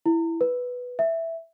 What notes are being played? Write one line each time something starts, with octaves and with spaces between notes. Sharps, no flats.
E4
B4
E5